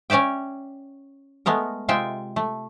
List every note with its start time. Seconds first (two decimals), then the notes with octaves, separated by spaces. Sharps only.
0.10 C#4 C#5 D5 E5 G5
1.46 G#3 A3 B3 A#4
1.88 C3 G#3 F4 E5 G5
2.36 A3